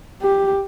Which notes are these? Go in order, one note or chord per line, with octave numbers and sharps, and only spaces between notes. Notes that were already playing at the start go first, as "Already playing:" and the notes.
G4